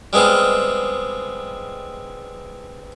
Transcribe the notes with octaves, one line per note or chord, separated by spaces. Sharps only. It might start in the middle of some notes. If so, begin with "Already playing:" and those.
G3 G#3 B3 C4 F4